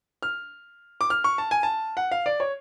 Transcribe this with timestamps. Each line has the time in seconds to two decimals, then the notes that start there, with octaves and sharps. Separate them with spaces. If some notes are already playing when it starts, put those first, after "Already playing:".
0.23 F6
1.01 D6
1.10 F6
1.24 C#6
1.38 A5
1.51 G#5
1.63 A5
1.97 F#5
2.11 F5
2.26 D5
2.40 C#5